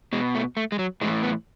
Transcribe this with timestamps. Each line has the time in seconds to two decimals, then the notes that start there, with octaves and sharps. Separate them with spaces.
0.13 B2 G#3
0.35 A3
0.57 A3
0.72 G#3
0.79 F#3
1.01 A2 G#3
1.05 E3
1.23 B3